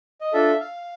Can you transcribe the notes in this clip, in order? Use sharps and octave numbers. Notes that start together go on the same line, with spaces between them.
D#5
D4 F4 A4 E5
F5